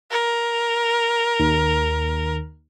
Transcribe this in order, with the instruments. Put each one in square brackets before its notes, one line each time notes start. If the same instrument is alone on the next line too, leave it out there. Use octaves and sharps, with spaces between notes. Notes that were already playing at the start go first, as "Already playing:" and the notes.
[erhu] A#4
[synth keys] D#2